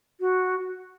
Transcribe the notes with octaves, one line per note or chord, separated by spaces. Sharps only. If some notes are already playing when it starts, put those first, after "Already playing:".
F#4